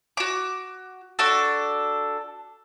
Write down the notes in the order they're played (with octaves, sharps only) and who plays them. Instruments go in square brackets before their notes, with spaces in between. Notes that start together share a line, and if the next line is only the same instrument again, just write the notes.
[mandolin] F#4 D6
D4 F#4 A4